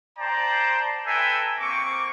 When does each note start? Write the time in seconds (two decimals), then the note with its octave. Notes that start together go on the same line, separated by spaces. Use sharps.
0.18 C5 D5 G5 A5 A#5
1.06 A4 B4 E5 G5 G#5 A#5
1.60 A#3 C4 C#6 D6